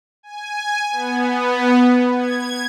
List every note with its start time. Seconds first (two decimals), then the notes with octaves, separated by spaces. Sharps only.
0.23 G#5
0.92 B3
2.17 G#6